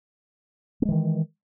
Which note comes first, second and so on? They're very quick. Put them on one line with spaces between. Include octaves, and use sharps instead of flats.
A#3 G#3 E3 D#3